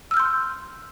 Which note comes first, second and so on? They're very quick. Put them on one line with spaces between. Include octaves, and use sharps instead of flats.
E6 F6 G6 C6